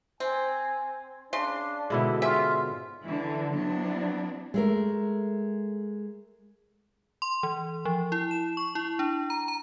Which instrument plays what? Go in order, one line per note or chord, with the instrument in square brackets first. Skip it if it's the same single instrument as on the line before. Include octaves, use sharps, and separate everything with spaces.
[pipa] C4 [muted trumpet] G#5
[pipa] C#3 C6 [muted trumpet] D4
[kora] G#2 B2 D3 [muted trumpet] E4
[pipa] G3 C#4 E5 [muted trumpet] F4
[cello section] D3 E3
F#3 B3 C4 D4 E4
[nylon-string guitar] G#3 A3 A#4
[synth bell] C6
E3
F3
E4
E7
C#6
E4
D4
A#5
A#5